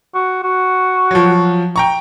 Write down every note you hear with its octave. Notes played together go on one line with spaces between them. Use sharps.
F#4
F#4
F3 F#3
G5 A#5 C#6